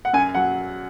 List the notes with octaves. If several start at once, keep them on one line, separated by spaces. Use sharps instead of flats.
F#5
F#2 G#5
F#3 F#5